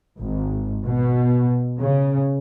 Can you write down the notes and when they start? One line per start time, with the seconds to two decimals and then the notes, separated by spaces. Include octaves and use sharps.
0.20 G#1
0.85 B2
1.79 C#3